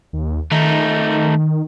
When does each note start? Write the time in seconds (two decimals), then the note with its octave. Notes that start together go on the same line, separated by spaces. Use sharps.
0.13 D#2
0.52 D#3 A3 D#4